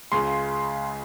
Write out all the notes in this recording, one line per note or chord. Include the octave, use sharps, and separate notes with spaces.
C#2 C#3 G#3 C6